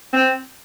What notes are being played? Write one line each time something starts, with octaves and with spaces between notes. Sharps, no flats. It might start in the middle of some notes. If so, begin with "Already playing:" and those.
C4